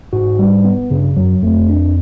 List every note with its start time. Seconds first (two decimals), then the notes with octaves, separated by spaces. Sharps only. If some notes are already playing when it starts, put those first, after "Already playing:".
0.13 G#2 F#4
0.39 G3
0.65 B3
0.91 G2 C#3
1.17 F#2 F#3
1.43 F2 A3
1.69 D4